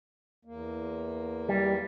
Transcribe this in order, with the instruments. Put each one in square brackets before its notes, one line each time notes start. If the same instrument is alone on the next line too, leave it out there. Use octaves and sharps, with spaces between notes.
[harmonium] E2 A#3
[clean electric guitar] G3